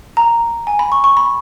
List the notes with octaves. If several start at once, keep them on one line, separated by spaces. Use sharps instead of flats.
A#5
G#5
B5
C#6
C#6
B5